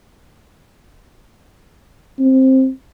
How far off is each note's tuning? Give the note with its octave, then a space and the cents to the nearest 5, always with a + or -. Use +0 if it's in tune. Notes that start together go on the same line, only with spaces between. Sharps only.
C4 +10